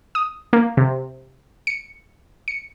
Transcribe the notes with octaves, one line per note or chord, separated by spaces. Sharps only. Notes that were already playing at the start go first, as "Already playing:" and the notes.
D#6
A#3
C3
C#7
C#7